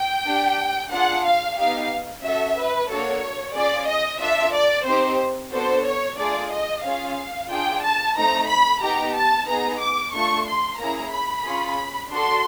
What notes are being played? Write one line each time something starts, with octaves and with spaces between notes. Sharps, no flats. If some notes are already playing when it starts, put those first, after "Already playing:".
Already playing: G5
D4 G4
D4 F4 G#4 F#5
F5
B3 D#4 G4 F5
C#4 F#4 A4 E5
B4
A#3 D4 F#4 A4 C#5
C#4 F4 G#4 D5
D#5
D4 F4 A4 E5
D5
C4 D#4 G4 C5
B3 D4 F#4 A4 C5
C#5
A3 D4 F4 G#4 D5
D#5
C#4 F4 G#4 F5
D4 F4 G#4 G5
A5
A3 C4 D#4 A#5
B5
B3 D#4 G4 A#5
A5
B3 D#4 G#4 A#5
D6
A3 D4 F4 A4 C#6
C6
A#3 C#4 E4 G#4 A#5
B5
C#4 F4 G#4
D4 F#4 A4 C6